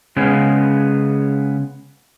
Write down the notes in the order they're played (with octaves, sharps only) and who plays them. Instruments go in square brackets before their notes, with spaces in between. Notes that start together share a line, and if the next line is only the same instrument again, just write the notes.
[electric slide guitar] C#3 G#3 B3 C#4